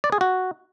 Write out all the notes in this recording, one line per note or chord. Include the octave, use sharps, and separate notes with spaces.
D5
G#4
F#4